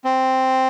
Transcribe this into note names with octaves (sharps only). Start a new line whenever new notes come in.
C4